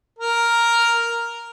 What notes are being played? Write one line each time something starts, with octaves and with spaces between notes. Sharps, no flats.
A#4